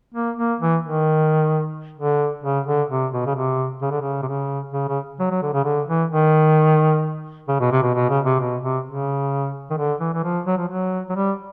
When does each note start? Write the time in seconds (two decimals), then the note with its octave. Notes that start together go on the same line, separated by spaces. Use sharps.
0.14 A#3
0.37 A#3
0.60 E3
0.83 D#3
1.98 D3
2.44 C#3
2.67 D3
2.90 C3
3.13 B2
3.26 C#3
3.35 C3
3.82 C#3
3.91 D3
4.01 C#3
4.22 C3
4.28 C#3
4.73 C#3
4.89 C#3
5.20 F#3
5.31 F#3
5.42 D3
5.53 C#3
5.64 D3
5.88 E3
6.10 D#3
7.48 C#3
7.60 B2
7.71 C3
7.82 B2
7.94 B2
8.09 C#3
8.25 C3
8.40 B2
8.63 C3
8.86 C#3
9.70 D#3
9.78 D3
10.00 E3
10.14 E3
10.24 F3
10.46 F#3
10.58 F3
10.68 F#3
11.09 F#3
11.15 G3